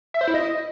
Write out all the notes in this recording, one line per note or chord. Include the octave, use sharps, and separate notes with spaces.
E5
C5
E4
D#5